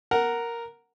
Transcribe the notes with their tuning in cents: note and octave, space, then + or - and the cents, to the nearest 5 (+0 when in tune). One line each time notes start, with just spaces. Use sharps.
A#4 +0 F#5 +0